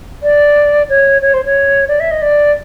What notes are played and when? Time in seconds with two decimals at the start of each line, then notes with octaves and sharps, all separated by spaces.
0.22 D5
0.89 C#5
1.21 C#5
1.33 C5
1.44 C#5
1.87 D5
1.99 E5
2.10 D#5
2.21 D5